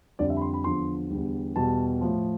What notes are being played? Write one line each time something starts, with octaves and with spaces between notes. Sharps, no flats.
F2 D3 G3 D5
E5
B5
C6
B5
E2 D3 F3 C6
E2 D3 G3
E2 B2 G3 A5
A2 F3